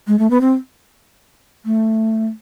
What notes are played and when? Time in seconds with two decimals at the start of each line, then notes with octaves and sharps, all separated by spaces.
0.08 G#3
0.19 A3
0.31 B3
0.41 C4
1.65 A3